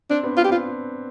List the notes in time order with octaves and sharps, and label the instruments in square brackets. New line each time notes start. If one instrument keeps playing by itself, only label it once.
[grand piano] C4 [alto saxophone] D4
[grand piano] B3 D4
[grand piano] B3 [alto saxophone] F4
[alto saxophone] G4
[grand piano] C4 [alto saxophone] F4